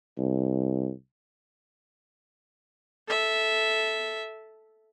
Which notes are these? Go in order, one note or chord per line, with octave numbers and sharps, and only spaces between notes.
C2
A4 E5